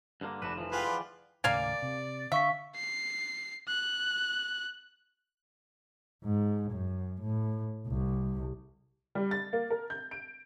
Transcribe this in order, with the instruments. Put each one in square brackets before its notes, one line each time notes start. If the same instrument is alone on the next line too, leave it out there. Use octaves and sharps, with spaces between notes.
[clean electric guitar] G2 D3 A#3
[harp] F1 E7 [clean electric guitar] D4 F#4 B4
[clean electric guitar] E3 F3
[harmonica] F4 B4 [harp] G#4 F#5 G5
[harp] D5
[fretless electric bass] D#2 A2 C#3 [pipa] A#3 F5 G#5 [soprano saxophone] D5
[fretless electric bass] C3
[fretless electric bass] D3 [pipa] E5 [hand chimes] F5 C#6 B6
[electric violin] C7
F#6
[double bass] G#2
F#2
A2
C2
[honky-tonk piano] G3
A6
A#3
A#4
G6
D7